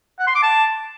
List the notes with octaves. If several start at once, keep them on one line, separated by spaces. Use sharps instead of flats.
F#5
C6
D6
A5